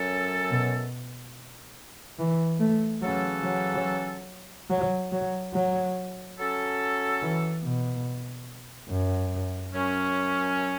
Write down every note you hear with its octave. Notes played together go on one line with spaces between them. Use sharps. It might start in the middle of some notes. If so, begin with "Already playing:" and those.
Already playing: F#2 F#3 C#4 A4
B2
E3
A3
C#3 E3 F#3 C#4 A4
F#3
F#3
F#3
F#3
F#3 C#4 A4
E3
B2
F#2
F#2 F#3 C#4